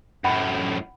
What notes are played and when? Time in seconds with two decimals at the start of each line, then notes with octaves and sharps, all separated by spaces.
0.24 F#2 A2 F#5 G5 B5